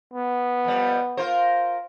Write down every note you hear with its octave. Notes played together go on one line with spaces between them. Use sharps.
B3
F2 G3
F4 A#4 C5